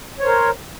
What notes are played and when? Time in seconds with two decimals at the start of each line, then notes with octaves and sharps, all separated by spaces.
0.19 C#5
0.23 C5
0.26 A#4